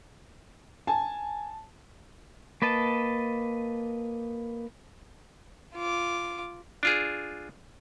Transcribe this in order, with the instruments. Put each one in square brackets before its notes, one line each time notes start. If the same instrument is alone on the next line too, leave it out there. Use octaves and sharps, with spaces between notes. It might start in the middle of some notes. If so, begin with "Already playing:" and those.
[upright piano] G#5 [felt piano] A5
[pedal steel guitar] A#3 B4 D#5 A5
[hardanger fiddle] F4 D6
[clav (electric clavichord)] D4 F4 G#4